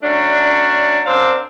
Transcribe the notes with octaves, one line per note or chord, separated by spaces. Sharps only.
F#3 A3 C#4 D4
F#2 C4 D4 D5 F5